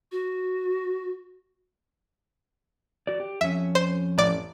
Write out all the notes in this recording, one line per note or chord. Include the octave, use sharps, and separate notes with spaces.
F#4
F#4 D5
G4
F2 C#4 E5
C5
A1 D5